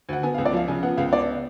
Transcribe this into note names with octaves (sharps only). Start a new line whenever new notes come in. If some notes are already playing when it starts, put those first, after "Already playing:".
D2 F#5
B3 G#5
F5
C#2
D5
F3 F5
C#3 G#5
B3 F#5
C#2 F5
B3 D5